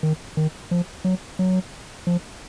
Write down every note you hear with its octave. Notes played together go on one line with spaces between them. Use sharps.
D#3
D#3
F3
F#3
F#3
F3